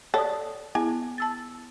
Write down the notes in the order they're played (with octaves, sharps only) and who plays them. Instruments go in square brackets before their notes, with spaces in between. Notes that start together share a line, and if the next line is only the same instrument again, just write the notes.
[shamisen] A4 [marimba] C#5 D5 D#6
[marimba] B3 E4 G#4 [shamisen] G#5
[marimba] A5 E6 A6